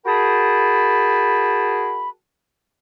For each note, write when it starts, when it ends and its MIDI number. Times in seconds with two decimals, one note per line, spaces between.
0.06 2.09 66
0.06 2.09 68
0.06 2.09 70
0.06 2.09 79
0.06 2.09 81
0.06 2.09 83